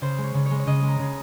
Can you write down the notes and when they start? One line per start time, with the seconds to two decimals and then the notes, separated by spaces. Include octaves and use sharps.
0.01 C#3 C5
0.18 G#3
0.24 C#5
0.34 C#3
0.46 C#5
0.51 G#3
0.60 C#5
0.67 C#3 D#5
0.83 G#3
0.88 A#5
0.99 C#3